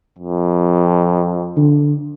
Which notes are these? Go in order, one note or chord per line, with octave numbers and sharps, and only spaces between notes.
F2
D3